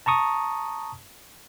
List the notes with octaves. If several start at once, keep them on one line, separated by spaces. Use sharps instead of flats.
A5 A#5 C#6 D#6